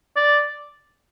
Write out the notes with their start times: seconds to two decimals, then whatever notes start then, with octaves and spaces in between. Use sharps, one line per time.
0.16 D5